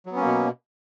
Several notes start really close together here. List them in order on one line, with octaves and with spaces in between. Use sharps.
F#3 B3 C#4 A#3 B2